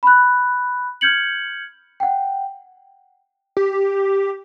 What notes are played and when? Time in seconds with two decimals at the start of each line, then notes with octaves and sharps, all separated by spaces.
0.03 B5 F#6
1.01 F6 G6 G#6 C#7 F#7
2.00 F#5 G5
3.57 G4